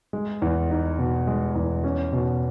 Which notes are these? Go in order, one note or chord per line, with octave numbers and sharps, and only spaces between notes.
G#3
E2
D#4
B2
G#3
E2
C#4
B2